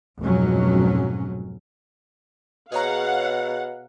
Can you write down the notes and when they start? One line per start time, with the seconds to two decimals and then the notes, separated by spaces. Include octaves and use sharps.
0.20 F1 G#2 B2 F#3 C#4
2.72 B2 G#4 C#5 F5 F#5 A#5